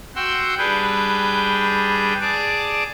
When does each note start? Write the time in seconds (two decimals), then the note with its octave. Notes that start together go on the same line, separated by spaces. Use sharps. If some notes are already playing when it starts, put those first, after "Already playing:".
0.15 F#4 F#5 G5 C6 E6
0.58 G3 D4 G#4 B4 G5
2.21 G#4 D5 A5 D6